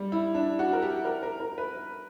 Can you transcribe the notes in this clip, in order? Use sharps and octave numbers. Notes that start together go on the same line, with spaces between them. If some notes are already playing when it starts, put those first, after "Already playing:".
Already playing: G3
E4
D4
F#4
A#4
G4
A#4
A#4
A#4
B4